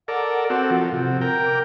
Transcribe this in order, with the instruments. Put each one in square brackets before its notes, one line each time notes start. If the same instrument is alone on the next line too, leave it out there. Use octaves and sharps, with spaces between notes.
[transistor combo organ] A4 A#4 D5 [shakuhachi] F#5
[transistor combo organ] C4 F#4 A4
F3
C3
[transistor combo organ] A#4 G5 [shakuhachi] A#5
[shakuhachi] D6